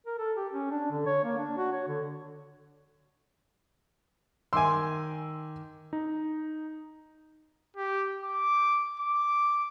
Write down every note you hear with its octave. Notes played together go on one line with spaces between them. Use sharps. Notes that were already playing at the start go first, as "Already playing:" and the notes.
A#4
A4
G4
C#4
D4
D3
C#5
A#3
D4
F#4
C#5
D3
D#3 G#5 C6 D6 E6
D#4
G4
D6
D6